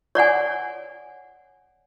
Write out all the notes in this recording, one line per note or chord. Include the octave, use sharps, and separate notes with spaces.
C#5 D5 F#5 G#5